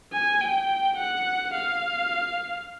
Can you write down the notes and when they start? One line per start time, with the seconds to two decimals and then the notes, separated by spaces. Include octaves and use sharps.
0.13 G#5
0.41 G5
0.97 F#5
1.54 F5